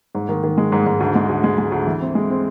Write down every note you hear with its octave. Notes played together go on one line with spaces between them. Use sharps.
G#2
D#3
D#3
G#3
G#2
G#2
D2
G#3
D2
G#3
G#3
D2
E3
C4
G#3
C4